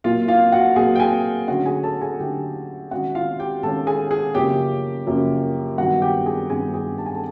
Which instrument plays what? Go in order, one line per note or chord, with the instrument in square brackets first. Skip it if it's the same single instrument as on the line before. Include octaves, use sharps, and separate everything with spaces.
[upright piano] A#2 F#3 A#3 F4 F5
F4 F5
F#4 F#5
A#2 F#3 A#3 G#4 G#5
G5
G#4 G#5
D3 F#3 A3 C#4 F#4 F#5
G#4 G#5
A4 A5
G#4 G#5
D3 F#3 A3 C#4 G4 G5
D#3 G#3 C#4 F#4 F#5
F4 F5
G4 G5
D#3 G#3 C#4 A4 A5
G#4 G#5
G#4 G#5
F#2 C#3 F3 A#3 C#4 G4 G5
F#2 C#3 F3 A#3 C#4
G2 D#3 F#3 B3 F#4 F#5
G4 G5
G#4 G#5
G2 D#3 F#3 B3 G#4 G#5
G#4 G#5
A5
G#5
A4 A5